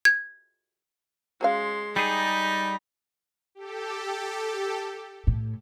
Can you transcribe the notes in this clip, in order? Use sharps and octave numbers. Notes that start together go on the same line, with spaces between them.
G#6
F#3 G#3 C#4 F5 C6
G3 D#4 G#4 A#5
G4 A4
A2